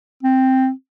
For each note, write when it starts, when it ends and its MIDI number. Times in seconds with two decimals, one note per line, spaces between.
0.23 0.70 60